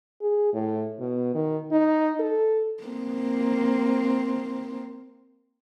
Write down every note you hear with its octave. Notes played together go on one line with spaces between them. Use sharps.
G#4
A2
B2
D#3
D#4
A4
A#3 C4